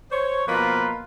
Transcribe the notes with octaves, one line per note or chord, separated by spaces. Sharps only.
C5 C#5
B2 F3 A#3 F4 B4